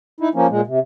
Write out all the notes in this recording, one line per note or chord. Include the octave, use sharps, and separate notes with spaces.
D#4 E4
F3 A#3 C#4
A#2 G#3
C3